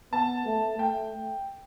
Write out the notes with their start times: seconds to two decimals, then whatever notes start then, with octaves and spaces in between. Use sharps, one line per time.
0.12 B3 A5
0.45 A3
0.79 A3 G5